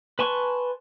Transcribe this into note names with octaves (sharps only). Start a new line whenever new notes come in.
B4 G#5 A5 C6 C#6